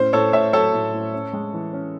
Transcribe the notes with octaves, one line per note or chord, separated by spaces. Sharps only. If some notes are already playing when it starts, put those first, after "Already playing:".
Already playing: A2 C#4 C5
A2 A4 C#5
A2 C#5 E5
F#3 A4 C#5
A2
A2
C#4
G#3
E3
C#4